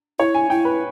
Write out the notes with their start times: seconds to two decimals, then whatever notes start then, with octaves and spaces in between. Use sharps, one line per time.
0.19 E4 C#5
0.35 G#5
0.50 E4 G5
0.65 B4